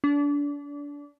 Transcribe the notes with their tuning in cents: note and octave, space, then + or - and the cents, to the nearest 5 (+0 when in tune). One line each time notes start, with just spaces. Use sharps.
D4 -30